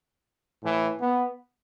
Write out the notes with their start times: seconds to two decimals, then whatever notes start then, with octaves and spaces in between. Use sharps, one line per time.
0.62 A2 E3
1.01 B3